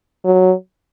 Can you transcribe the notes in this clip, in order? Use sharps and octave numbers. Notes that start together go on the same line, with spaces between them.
F#3